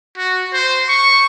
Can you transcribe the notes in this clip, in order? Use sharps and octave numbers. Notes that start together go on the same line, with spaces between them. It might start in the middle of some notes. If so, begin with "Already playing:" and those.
F#4
C5
C#6